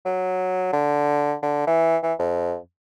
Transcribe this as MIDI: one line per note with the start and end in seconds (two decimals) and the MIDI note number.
0.05 0.69 54
0.73 1.34 50
1.43 1.63 50
1.67 1.97 52
2.03 2.14 52
2.19 2.56 41